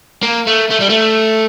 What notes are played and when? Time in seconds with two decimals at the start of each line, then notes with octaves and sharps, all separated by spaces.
0.23 A#3
0.47 A3
0.71 A3
0.81 G3
0.90 A3